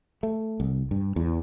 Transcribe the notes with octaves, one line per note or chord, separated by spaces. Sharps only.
A3
C2
G2
E2